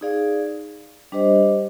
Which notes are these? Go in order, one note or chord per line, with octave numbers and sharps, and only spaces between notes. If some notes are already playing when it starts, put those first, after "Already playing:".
D#4 G#4 D5 F5
G3 D4 G4 C5 D#5